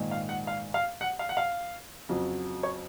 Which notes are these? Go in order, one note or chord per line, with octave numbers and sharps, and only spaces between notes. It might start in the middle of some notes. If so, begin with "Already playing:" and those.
Already playing: A#1 G#2 D#3
F5
F#5
F5
F5
F#5
F5
F#5
F5
F2 C#3 F#3
C#5